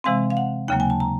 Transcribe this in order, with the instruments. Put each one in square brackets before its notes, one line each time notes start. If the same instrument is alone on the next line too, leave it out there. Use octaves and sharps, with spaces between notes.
[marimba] C3 E3 G#3 C4 F5
F5
F#5
D#2 C#3 F#3 A#3 G5
G#5
A5
A#5